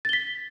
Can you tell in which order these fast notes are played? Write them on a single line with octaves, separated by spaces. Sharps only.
A6 G7 B6